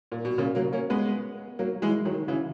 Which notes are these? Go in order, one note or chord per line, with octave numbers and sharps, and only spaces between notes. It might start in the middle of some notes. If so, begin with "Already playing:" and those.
A#2
B2
A#2 C#3
F#3 A#3
A#3 C#4
G#3 B3
F#3 A#3
E3 G#3
D#3 F#3
C#3 E3